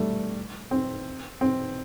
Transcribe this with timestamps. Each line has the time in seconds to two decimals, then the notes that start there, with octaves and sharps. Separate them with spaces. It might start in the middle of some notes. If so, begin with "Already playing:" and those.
Already playing: G3 A3
0.71 C4
1.41 C4